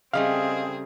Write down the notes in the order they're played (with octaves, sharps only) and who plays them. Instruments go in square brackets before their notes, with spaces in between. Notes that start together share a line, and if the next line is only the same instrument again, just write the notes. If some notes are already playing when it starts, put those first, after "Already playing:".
[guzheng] C#3 G3 A3 [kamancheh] C4 G#4 [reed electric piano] D#5 F5